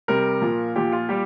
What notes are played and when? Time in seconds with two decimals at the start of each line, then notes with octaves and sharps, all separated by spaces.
0.08 C3 G3 A#4
0.42 A#2 F3
0.75 A#2 F3 G4
0.92 F4
1.09 A#2 G3 G4